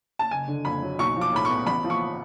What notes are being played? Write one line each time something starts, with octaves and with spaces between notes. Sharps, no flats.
A5
F#1 G#5
D3
F2 B5
F#3
B1 C#6
F3
D6
A2 B5
B3 C#6
A1 B5
F3
C#6